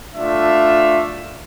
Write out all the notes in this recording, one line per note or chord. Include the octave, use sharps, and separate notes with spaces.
A3 D4 F4 E5